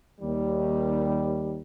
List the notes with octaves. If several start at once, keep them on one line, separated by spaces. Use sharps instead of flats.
D#2 D#3 G3